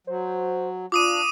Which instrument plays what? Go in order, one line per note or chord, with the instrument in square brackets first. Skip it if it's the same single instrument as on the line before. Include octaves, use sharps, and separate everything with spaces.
[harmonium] F#3 [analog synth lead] C5
[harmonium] D4 [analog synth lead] F4 [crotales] D6 D#6 D#7